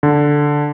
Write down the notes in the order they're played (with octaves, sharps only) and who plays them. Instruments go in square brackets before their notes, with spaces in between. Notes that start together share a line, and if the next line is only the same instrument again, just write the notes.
[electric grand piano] D3